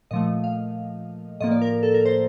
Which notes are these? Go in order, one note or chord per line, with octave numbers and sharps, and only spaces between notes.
A#2 F3 A3 D#5
F5
A2 F3 A#3 D#5
D5
A#4
A4
A#4
C5